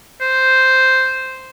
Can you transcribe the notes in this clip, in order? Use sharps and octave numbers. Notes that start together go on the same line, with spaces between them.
C5